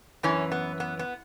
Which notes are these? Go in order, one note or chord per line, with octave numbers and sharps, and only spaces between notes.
F#2 E3 C#4
B3
B3
B3